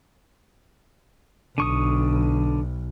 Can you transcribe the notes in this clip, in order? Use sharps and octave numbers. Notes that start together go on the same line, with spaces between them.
B1 D3 C#6 D#6